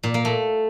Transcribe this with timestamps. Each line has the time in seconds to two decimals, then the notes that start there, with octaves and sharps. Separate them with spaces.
0.03 A#2
0.14 A#3
0.25 A3